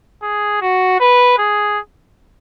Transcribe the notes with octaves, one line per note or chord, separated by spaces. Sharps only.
G#4
F#4
B4
G#4